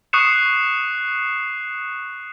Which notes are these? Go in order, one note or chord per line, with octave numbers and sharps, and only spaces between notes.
C#6 D#6 F#6 C7 C#7 E7